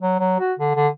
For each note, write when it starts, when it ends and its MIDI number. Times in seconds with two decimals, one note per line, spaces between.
0.02 0.15 54
0.20 0.35 54
0.40 0.53 66
0.59 0.71 50
0.76 0.88 50